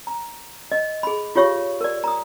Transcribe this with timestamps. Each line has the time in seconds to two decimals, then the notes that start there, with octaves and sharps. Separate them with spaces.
0.07 A#5
0.72 D#5
1.03 G#4 B5
1.35 F4 G4 C#5 F5 C#6
1.81 A#4 D5
2.04 A#5 D#6